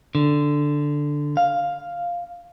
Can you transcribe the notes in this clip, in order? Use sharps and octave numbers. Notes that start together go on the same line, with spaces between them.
D3
F5